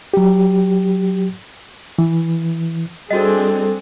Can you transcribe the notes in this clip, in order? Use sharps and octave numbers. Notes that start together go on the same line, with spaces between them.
F#3 G4
E3
G3 C4 D4 F#4 G#4 A4 D#5